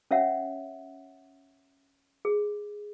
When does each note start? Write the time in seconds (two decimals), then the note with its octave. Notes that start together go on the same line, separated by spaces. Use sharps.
0.11 C#4 C#5 E5 F#5
2.25 G#4